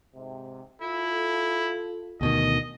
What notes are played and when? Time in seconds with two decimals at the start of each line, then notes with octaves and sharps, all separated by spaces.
0.15 G#2 C3
0.82 E4 F4 A4
2.21 D2 B2 D#3 D#5